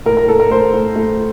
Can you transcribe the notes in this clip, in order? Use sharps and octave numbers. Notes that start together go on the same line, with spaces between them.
A2 A#4
A#4
A2 A4
A#4
A3 C5
A2
A3